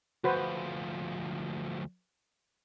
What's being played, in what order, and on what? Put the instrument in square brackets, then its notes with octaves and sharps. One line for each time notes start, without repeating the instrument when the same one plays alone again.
[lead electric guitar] D2 F3 [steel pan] F#4 B4 C5